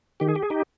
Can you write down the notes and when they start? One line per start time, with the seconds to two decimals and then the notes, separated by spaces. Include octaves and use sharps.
0.20 D#3 G4
0.28 G#4
0.36 G4
0.42 G#4
0.50 D#4 G4